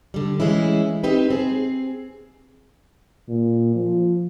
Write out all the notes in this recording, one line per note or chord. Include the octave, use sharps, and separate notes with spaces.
D3 G3
E3 G#3 A3 C#4 E4
C4 D#4 G4 B4
C4 G#4
A#2
F3